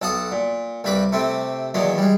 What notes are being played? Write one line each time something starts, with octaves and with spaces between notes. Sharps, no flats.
B1 A4 F#5 D#6
A#2
C2 G2 B4 B5 D6
C3 A3 C4
E2 A#2 D#3 F#3 B3
G3 G#3